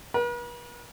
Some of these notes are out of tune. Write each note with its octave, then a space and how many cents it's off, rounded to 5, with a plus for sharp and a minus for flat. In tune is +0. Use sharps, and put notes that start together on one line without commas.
B4 -45